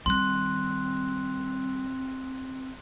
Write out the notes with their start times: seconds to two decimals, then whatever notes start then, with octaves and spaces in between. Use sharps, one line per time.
0.06 D#3 G3 C4 C6 F#6